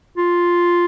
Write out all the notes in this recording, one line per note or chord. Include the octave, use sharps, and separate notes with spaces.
F4